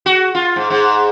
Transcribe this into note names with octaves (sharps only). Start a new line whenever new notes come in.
F#4
F4
G#2
G#2